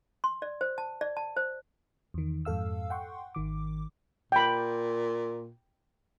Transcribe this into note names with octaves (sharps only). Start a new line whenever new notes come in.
C6
D5
C5
A5
D5
A5
C5
E2 D#3
F2 G#2 A4 F5 E6
F#5 G5 C6 C#6
G#1 D#3 D6
A#2 G5 B5